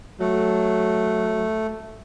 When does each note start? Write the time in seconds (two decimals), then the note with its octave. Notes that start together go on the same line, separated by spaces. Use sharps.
0.20 F#3 A3